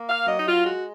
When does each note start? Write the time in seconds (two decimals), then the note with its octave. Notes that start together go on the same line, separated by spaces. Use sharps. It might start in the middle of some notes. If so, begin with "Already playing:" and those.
Already playing: A#3
0.08 F5
0.27 F#3 D#5
0.39 D#4
0.47 F4
0.65 G#3 F#4